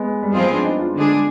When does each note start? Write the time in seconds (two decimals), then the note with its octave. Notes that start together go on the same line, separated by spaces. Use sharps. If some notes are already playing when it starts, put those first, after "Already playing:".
Already playing: G#3 B3
0.23 G3
0.33 F3 G#3 C4 F4 G#4
0.43 B3
0.53 D4
0.64 D#4
0.79 F4
0.95 D3 G#3 D4 G#4